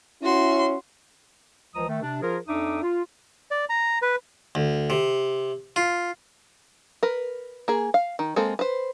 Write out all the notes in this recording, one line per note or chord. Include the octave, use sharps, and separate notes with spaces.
C#4 E4 F#4 C6
C#2 E3 F3 D#5 A#5 D#6
D#3 A3
C3 D4
F3 F4 G#4 A#4
F2 D4 D#4 E5 D6 D#6
F4
D5
A#5
B4
D2
C3
F4
A#4 B4
A#3 G#4
F5
D#3
G#3 A#3 C4 A4
B4 C5